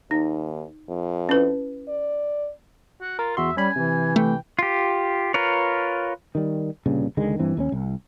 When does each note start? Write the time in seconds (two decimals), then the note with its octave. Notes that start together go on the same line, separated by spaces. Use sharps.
0.11 D#2 D#4
0.89 F2
1.29 C#4 E4 B4
1.89 D5
3.01 F#4
3.19 F4 A#4
3.37 E2 F#4 E5 C6
3.57 G3 C#4 G#5 B5
3.76 C3 E3
4.16 A3 G5
4.59 F4 G4
5.34 F4 A#4 B4 C#5
6.35 D#3 G3
6.86 C2 G2 A#2 C#3
7.17 C#2 D3 D#3 G#3
7.39 G2 E3 C4
7.57 D#2 G3 C#4
7.72 C2